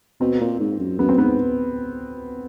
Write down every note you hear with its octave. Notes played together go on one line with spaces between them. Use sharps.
B2 C4
A#2
G#2
F#2
F#2 B3
C4
G#2 B3